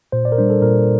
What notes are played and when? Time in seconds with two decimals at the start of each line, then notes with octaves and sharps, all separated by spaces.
0.12 A#2 C5
0.25 D5
0.32 A#4
0.38 G3 D4 C5
0.50 A4
0.62 A#2 A#4